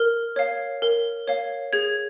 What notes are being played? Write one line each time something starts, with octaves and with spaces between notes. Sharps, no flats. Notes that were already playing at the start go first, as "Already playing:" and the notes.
Already playing: A#4 F6
C#5 F5
A#4
C#5 F5
G#4 G#6